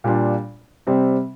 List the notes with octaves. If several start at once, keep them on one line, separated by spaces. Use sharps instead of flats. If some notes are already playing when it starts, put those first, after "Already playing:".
A#2 G3 D4 F4
C3 G3 C4